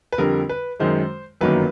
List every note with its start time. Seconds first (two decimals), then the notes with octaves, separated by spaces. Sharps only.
0.12 B4
0.18 F2 D3 G3 A#4
0.49 B4
0.79 F#2 D#3 G#3 C5
1.41 G1 F#2 D#3 F#3 A#3 B4